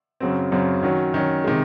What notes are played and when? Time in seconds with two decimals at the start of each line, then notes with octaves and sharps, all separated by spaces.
0.20 F#2 C#3 F#3 C4
0.52 F#2 C#3 F#3 C4
0.83 D#3 F#3 C#4
1.14 D#3 F#3 C#4
1.44 C3 D#3 G#3